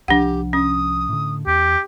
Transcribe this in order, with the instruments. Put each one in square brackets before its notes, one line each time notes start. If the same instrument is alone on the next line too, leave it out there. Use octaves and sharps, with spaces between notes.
[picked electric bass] C2 F3 [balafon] D4 F#5 [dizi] G4
[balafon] C#4 [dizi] D#6
[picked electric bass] A2 D3
[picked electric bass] E2 [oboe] G4